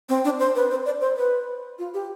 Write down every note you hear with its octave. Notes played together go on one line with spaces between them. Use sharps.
C4
D4
C5
B4
C5
D5
C5
B4
F4
G4